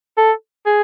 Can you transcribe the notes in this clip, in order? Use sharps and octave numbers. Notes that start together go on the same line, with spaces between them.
A4
G#4